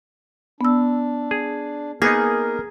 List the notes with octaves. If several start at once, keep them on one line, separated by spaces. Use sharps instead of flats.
B3 D4 E6
G#4
A#3 B3 D#4 G#4 A#4